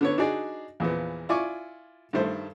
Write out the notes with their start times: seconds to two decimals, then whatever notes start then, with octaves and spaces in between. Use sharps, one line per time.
0.01 D3 B3 C#5
0.18 D4 D#4 F#4 G#4 D5
0.80 E2 A#2 F3 B3
1.29 E4 F4 D5 G#5 C#6 D6
2.13 G2 D#3 A3 C5